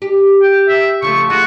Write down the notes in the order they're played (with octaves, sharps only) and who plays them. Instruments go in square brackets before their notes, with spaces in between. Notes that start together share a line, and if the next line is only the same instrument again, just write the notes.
[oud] G4
[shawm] G5
E5
[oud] C#3 F3 A3 [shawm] C#6
[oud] F4 G#4 [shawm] F#4